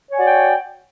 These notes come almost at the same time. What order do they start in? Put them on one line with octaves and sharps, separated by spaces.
C#5 G#5 D5 F#4 G5